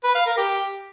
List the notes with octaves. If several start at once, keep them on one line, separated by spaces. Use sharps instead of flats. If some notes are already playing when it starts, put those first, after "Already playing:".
B4
F5
A#4
G4